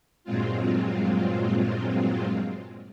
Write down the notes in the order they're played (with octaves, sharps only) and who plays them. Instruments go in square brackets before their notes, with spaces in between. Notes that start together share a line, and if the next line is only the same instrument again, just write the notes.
[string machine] G2 A#2 F#3 G#3 C4 F4